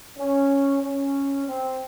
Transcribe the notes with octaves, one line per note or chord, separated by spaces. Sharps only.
C#4
C#4
C4